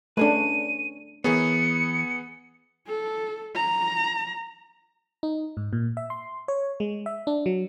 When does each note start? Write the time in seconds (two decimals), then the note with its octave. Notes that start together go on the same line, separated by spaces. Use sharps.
0.17 A3 C#4 D4 G#4 B4 D#7
1.24 E3 B3 G#4 A#4 C#5 C#7
2.87 A4
3.55 A#5
5.23 D#4
5.57 G#2
5.73 A#2
5.97 E5
6.10 C6
6.48 C#5
6.80 G#3
7.06 E5
7.27 D4
7.46 F#3